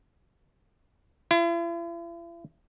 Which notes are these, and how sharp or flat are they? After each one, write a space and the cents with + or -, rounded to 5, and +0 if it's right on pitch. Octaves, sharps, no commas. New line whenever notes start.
E4 +45